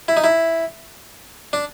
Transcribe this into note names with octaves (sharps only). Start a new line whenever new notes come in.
E4
D#4
E4
D4